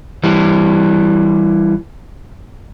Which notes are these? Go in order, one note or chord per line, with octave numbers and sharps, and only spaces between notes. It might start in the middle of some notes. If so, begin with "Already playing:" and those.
E3 G3